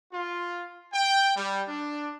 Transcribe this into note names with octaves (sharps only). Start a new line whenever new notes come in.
F4
G5
G3
D4